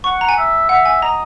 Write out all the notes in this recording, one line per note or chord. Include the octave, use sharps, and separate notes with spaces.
F#5 C#6
A#5
G#5
E5
E5 F#5
G#5
D#5 A#5